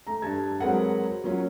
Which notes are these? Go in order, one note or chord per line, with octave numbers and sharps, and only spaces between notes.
A3 A#5
G2 A5 G#6
F#3 G#3 C4 A#4 B4 F#5
F#3 A#3 C#4 F4